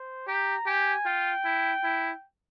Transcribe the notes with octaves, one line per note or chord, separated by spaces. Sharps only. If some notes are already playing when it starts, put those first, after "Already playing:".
Already playing: C5
G4 A#5
G4 G#5
F4 G5
E4
E4